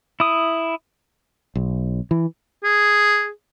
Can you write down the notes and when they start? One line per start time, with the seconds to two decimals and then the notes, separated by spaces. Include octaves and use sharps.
0.20 E4 D#6
1.55 B1
2.11 E3
2.64 G#4